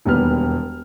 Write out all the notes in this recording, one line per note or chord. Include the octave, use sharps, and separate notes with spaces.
E1 D#2 G3 B3 B4 F6